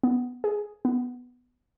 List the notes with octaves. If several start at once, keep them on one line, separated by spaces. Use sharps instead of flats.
B3
G#4
B3